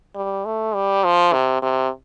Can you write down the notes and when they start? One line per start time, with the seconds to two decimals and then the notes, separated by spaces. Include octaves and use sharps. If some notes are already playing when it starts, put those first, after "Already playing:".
0.15 G3
0.45 A3
0.75 G3
1.04 F3
1.33 C3
1.62 C3